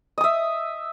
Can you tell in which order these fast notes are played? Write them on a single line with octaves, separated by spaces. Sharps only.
D#5 D#6 E5